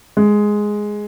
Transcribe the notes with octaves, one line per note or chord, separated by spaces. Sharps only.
G#3